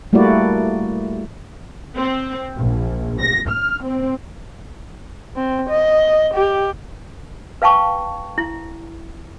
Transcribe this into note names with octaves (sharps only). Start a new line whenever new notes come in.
G3 A3 A#3 E4 F#4 D5
C4
A#1
A#6
F6
C4
C4
D#5
G4
B4 F5 G5 A5 C#6
E4